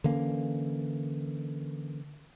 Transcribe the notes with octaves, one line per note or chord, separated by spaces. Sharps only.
D3 E3 A#3 C#4